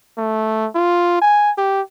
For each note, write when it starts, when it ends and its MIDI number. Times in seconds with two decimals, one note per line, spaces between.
0.18 0.68 57
0.75 1.20 65
1.22 1.51 80
1.57 1.82 67